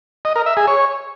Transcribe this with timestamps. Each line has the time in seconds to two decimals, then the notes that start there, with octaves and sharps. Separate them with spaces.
0.25 D#5
0.36 A#4
0.46 E5
0.57 G#4
0.68 C#5